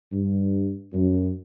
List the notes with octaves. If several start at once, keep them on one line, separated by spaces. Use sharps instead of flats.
G2
F#2